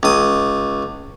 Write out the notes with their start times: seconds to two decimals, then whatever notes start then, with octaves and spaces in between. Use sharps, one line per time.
0.03 C#2 D#6